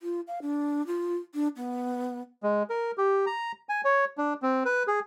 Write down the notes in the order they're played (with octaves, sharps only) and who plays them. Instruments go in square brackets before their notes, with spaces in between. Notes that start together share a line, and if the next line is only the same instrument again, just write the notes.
[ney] F4
F5
D4
F4
D4
B3
[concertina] G#3
A#4
G4
A#5
G#5
C#5
D4
C4
B4
G#4